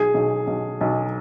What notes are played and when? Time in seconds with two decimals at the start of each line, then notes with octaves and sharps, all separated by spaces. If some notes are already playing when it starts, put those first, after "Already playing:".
Already playing: B1 G#4
0.14 B1
0.47 B1
0.81 B1